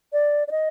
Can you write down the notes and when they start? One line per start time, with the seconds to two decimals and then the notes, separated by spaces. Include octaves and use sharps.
0.13 D5
0.48 D5
0.51 D#5